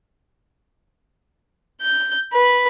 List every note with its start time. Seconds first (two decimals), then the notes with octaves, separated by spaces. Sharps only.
1.81 G6
2.33 B4